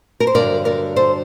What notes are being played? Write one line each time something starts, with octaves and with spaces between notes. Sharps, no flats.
A#4
C5
G2 D3 F#3 A#4 D5
A#4 D5
A4 C5